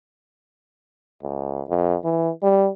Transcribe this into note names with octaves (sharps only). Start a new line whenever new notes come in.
C#2
F2
E3
G3